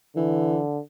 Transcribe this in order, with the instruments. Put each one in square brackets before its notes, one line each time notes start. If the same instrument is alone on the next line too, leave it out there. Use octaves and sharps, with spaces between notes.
[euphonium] D3 [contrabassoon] E3